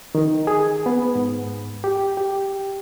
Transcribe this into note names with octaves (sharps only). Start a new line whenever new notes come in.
D#3
G#4
B3
G#2
G4
G4